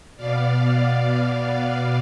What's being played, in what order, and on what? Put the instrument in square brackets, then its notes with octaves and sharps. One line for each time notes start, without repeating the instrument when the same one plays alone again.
[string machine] B2 B3 D5 F5